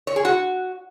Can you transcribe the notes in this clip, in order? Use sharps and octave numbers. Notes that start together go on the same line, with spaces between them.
C#5
G#4
F#4